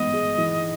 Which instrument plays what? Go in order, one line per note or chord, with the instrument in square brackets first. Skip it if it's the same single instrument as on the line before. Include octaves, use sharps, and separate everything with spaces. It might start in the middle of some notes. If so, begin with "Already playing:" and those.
Already playing: [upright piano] G#2 E3 B3 [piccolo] D#5
[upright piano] G#3
E3